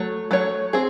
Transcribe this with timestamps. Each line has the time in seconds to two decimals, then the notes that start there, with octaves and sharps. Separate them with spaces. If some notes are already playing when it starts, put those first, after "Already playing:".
Already playing: F#3 A3 C#5
0.31 F#3 A3 C#5
0.73 C4 G#4